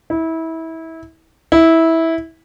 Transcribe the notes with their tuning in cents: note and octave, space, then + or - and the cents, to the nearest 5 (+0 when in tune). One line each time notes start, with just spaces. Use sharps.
E4 -25
E4 -15